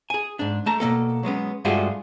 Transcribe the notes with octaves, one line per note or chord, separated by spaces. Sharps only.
G#4 G#5
G#2 D4
A3 A5 A#5
B2 A3 A#3 A4
F#3 G#3 B3 C#4
G2 G#3 A3 F4 F#4 G#4